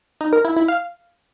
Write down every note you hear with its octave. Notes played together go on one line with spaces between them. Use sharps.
D#4
A#4
E4
E4
F5